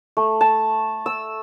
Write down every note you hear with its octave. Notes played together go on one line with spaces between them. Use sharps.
A3
A5
E6